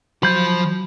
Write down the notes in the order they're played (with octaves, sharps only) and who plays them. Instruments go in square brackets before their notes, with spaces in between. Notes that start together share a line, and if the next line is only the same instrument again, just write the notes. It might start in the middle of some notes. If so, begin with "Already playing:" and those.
[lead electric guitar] F3 C5 [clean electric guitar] F#3 [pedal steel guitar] B5 G6